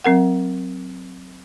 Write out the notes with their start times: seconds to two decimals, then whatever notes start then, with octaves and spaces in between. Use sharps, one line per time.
0.04 F#3 C4 A#4 F#5